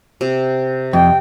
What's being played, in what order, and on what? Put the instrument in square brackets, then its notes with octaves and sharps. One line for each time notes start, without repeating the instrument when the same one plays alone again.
[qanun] C3
[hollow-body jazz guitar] F2 [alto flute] G5